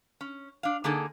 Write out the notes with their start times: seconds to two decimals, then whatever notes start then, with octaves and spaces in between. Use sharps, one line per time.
0.21 C#4
0.63 D4 F5
0.84 D3 A#3 D#4 G#4 A4